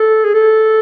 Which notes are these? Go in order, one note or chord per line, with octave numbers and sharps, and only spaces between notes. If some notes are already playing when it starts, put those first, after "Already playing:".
Already playing: A4
G#4
A4